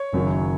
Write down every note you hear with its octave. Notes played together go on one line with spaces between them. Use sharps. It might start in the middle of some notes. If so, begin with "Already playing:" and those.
Already playing: C#5
F#1 F#2 D#3 F#3